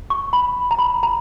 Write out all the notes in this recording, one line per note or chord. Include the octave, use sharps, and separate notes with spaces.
C#6
B5
A#5
B5
A#5